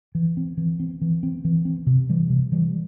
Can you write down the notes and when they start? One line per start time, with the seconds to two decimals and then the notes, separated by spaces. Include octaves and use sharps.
0.15 E3
0.37 C4
0.57 E3
0.80 C4
1.02 E3
1.23 C4
1.45 E3
1.65 C4
1.87 C3
2.09 E3 G3
2.30 C3
2.52 E3 G3